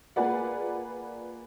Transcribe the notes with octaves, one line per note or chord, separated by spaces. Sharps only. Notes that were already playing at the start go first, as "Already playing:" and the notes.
A#3 F4 G#4 B4 D5 F#5